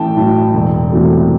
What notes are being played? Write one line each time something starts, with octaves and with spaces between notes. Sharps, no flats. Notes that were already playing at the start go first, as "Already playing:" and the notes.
Already playing: A1 A2 G5 A5
A2 F#3
E1
E2 C3 F#3 A3